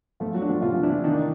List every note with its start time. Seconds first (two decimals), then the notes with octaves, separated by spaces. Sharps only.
0.20 F3 A3 F4
0.34 F#3 F#4
0.42 D4
0.49 F3 F4
0.62 C3 F3 F4
0.83 E3 D4 E4
1.04 D#3 D4 D#4